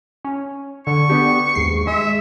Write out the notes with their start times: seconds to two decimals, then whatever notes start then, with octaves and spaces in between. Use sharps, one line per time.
0.24 C#4
0.87 D3 C#6
1.09 B3 D4 G4
1.55 D#2 G#2 C7
1.87 G#3 E5